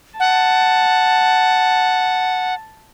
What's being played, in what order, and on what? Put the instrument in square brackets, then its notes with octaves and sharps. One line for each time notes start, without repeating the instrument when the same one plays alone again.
[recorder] F#5 [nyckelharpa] A5